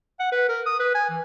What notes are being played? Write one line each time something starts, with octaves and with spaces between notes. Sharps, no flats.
F#5
B4
A#4
D#6
B4
G#5
E3